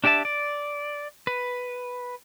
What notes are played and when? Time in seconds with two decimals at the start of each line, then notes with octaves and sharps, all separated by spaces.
0.04 D4 G4 D5 E5 A5
0.25 D5
1.27 B4